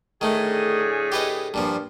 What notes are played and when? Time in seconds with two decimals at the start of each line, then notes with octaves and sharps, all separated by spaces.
0.21 A2 D3 D#3 A3 G#4
1.12 G4 B4 D#5
1.54 G2 A#2 F3